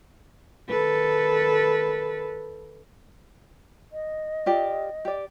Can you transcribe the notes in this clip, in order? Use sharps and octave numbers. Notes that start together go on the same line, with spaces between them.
D#3 A4 B4
D#5
F4 G4 D5
G4 D5